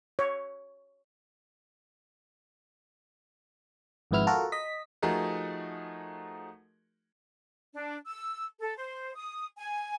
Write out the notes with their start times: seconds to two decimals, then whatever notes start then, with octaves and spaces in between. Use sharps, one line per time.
0.19 C#5
4.11 G#1 F2 G#2 B3 E4 F6
4.27 F4 F#4 A4 A#4
4.52 D#5 B6
5.02 F3 A3 D#4 F#4 G#4 A#4
7.74 D4
8.06 E6
8.59 A4
8.77 C5
9.15 D#6
9.58 G#5